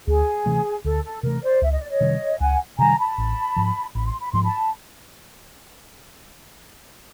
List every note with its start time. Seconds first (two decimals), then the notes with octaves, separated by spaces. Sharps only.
0.07 D2 G#4
0.46 C3 E3 A3
0.85 D2 A4
1.04 A4
1.23 C3 E3 A3 A#4
1.43 C5 D5
1.62 C#2 E5
1.71 D#5
1.81 D5
1.90 C#5 D#5
2.01 C3 D#3 G3
2.40 C#2 F#5 G#5
2.79 C3 D#3 G3 G#5 A#5
2.98 A5 B5
3.18 A1
3.56 G#2 F3
3.95 A1 B5
4.07 C6
4.20 B5
4.32 G#2 F3 C6
4.44 A5 B5